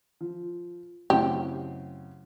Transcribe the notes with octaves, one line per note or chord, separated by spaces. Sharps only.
F3
F#2 C#3 A3 C4 E4 G4 C6